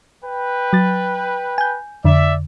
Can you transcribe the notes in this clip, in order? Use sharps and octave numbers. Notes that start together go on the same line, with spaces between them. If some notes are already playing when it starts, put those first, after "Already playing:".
B4 G5
F#3 A6
G#5 G6
F2 D3 D5 E5